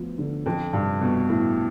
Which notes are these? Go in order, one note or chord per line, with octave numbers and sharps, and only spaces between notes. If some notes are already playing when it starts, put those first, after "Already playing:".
Already playing: D2 F3 B3
D3
F2 F3
G2 C3
C2 B2
A2 A3